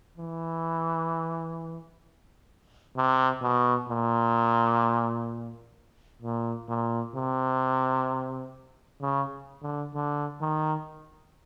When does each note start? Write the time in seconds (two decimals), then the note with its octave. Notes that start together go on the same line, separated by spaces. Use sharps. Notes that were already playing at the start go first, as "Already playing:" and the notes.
0.17 E3
2.97 C3
3.42 B2
3.89 A#2
6.22 A#2
6.68 A#2
7.15 C3
9.01 C#3
9.62 D3
9.94 D3
10.41 D#3